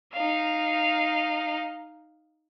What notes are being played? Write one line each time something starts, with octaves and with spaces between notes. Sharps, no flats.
D#4 F5